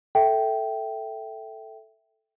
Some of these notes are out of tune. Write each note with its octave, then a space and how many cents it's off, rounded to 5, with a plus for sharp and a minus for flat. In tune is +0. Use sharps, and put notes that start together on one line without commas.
A4 +0 E5 +0 G5 -10